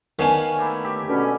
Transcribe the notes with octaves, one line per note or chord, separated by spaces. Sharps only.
D#3 B3 C#4 D4 F5 G#5
A3 A#3 E4
G4 E5
B2 D3 C#4